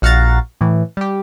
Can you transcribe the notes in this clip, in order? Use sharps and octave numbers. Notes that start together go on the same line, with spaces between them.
A#1 F#4 F5 F#5 A#5 A6
A2 E3
G3 G4